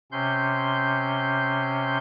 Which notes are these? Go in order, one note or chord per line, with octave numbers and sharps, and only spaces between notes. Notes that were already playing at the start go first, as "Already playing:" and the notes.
C3 C#4 C6 G6